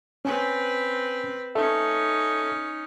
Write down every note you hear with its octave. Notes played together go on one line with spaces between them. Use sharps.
C4 C#4 B4 G#5
C#4 D#4 A4 E5